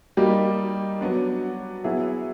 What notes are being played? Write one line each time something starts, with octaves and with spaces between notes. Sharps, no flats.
G3 A#3 D#4 G4
F#3 B3 D4
F#3 B3 E4 G#4